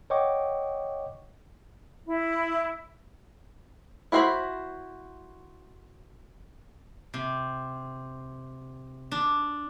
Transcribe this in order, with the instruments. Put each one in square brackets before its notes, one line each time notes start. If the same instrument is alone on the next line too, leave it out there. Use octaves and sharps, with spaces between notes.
[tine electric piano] C#5 D#5 F#5 G5 C#6 D6
[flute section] E4
[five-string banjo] E4 F#4 C5 E5 B5
[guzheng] C3
D4